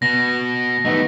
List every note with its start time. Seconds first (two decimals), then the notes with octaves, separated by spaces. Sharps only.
0.02 B2 A#6
0.85 D#3 G3 A3 B3 D#4